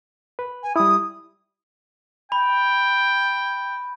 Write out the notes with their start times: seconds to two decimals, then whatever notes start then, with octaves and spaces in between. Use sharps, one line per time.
0.39 B4
0.63 G#5
0.76 G3 E4 D#6
2.32 G5 B5